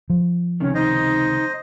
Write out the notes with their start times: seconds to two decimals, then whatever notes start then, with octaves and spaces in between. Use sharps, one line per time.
0.10 F3
0.60 C#2 C3 D#3 C#4
0.75 D#4 C5 D#5